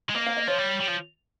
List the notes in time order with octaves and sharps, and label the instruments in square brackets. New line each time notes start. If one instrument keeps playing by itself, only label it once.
[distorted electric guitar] G#3
[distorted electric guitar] A#3 [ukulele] D#5
[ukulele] F5
D#5
[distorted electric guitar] F3 [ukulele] C#5
[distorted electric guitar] G3
G3
F3